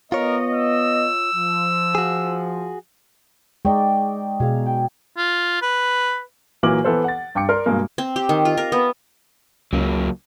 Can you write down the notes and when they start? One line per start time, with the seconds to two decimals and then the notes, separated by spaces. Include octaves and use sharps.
0.12 B3 F4 A#4 C#5 D#5
0.55 E6
1.35 F3
1.95 F#4 G#4
3.65 G#3 D#4 D5 G5 C#6
4.40 B2 G#4 F5
4.66 G5
5.17 F4
5.62 B4
6.63 A#2 E3 F#3 A#3 D6 F#7
6.84 E3 B3 A4 C5
7.04 F#5 A6
7.35 G2 G5 D6 C#7
7.49 A#4 D5 C6
7.66 G2 B2 G#3 A#3
7.98 C4
8.16 G4
8.29 D#3
8.45 F4
8.57 A#4
8.72 B3
9.73 C#2 F#3 A#3